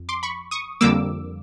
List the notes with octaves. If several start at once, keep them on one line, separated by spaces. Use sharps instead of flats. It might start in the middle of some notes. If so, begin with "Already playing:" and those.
Already playing: F2
C6 D6
B5 C#6
C#6 D#6
F2 D3 G3 A#3 D6 E6